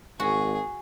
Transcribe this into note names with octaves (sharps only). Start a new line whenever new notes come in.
G#1 F#4 G#4